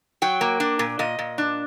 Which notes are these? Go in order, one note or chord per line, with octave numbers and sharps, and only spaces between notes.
F#3 G5
A#3
D4
A#2
A#2 D#5
A#2
D4